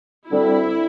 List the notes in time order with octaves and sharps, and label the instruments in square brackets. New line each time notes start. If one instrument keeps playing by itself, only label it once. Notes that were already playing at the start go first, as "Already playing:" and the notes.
[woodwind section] D2 D3 G3 C4 [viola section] E4